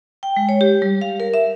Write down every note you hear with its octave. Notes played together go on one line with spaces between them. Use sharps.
G5
G#3
C#5
G4
G3
F5
A#4
E5